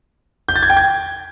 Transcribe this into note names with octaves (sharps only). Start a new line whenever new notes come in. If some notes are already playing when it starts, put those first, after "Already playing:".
G6
A6
G#6
G5
G#6